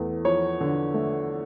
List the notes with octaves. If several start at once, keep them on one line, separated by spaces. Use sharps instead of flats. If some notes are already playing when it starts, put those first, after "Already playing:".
Already playing: E2 A3
F3 C#5
D3
A3